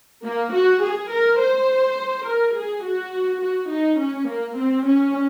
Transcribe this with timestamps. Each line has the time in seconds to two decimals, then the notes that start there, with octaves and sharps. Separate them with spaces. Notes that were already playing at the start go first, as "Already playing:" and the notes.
0.23 A#3
0.52 F#4
0.81 G#4
1.09 A#4
1.38 C5
2.25 A#4
2.54 G#4
2.83 F#4
3.41 F#4
3.70 D#4
3.98 C#4
4.27 A#3
4.56 C4
4.85 C#4